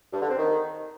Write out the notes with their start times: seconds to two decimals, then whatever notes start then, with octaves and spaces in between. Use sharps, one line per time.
0.13 G2
0.21 D3
0.29 C4
0.37 D#3